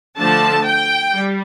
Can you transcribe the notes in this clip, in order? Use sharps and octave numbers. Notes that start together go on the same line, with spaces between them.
D3 F3 A3 D4 A5
G5
G3